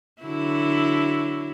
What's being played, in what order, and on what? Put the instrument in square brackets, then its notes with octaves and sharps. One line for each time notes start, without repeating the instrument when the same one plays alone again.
[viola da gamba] D3 F#3 E4